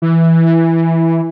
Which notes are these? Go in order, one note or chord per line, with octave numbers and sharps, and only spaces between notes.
E3